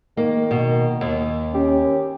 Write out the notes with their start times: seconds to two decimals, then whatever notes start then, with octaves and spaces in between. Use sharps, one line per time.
0.17 D#3 A#3
0.51 B2
1.01 D#2
1.55 C#4 G4